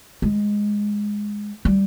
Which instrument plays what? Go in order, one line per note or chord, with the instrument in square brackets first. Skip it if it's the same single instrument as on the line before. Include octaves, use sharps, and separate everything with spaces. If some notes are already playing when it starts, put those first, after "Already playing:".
[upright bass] G#3
G3